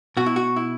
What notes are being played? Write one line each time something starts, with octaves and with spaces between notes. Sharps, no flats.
B2 F#4
E4
F#4
E4